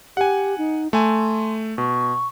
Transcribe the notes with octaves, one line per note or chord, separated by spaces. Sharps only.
G4 F#5 G#5
D#4
A3 G#5 C6
B2 C#6